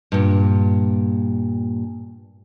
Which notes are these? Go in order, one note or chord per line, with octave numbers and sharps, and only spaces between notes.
G2 A#2